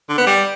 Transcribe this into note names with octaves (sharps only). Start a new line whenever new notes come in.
D3
B3
G3